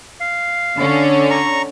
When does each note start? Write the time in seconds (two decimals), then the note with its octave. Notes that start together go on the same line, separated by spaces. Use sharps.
0.20 F5
0.76 D3 C#4
1.30 A#5 C#6